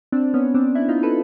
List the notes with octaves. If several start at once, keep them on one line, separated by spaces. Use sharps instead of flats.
C4 D4
B3 C#4
C4 D4
D4 E4
D#4 F4
A4 B4